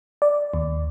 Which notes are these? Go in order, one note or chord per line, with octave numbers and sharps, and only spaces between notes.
D5
D#2